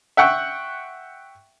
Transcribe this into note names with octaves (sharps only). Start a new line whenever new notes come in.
E5 F#5 G5 C#6 F#6